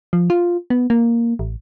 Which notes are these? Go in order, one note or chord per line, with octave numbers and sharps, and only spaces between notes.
F3
F4
B3
A#3
A1